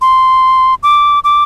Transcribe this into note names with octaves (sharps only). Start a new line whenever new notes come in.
C6
D6
D6